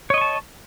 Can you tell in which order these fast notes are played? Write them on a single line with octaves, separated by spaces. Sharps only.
C#5 D#5 C#6 A5